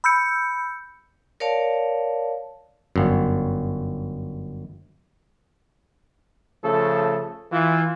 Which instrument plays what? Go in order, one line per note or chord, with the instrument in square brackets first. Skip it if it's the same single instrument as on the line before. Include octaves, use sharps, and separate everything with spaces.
[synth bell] B5 E6 G6 C#7
[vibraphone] A#4 C#5 D5 F5 A5
[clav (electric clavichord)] G1 F#2
[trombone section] C#3 F3 A3 A4
E3 F4